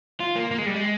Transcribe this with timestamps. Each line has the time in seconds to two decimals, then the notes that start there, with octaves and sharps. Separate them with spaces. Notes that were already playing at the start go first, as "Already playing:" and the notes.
0.20 F4
0.36 A#3
0.51 A#3
0.58 G#3
0.66 G3
0.75 G#3